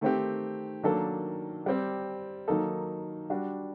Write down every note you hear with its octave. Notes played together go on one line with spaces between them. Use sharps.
D#3 A3 C4 G4
D#3 F#3 A#3 D4 A4
G3 C4 G4
D#3 F#3 A#3 D#4 A4
G3 D4 F#4